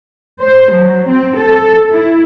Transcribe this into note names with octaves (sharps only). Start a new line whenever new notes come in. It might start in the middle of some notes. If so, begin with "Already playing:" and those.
C5
F#3
C4
A4
E4